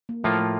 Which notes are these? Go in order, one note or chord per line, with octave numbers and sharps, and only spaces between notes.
A#3
A2 F3 A3 A#3 F4
A3